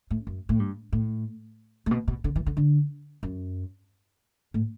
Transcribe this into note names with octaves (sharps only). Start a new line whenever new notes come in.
A2
F#2
A2
G2
A2
A2
B2
B2
D3
E3
D3
D3
F#2
A2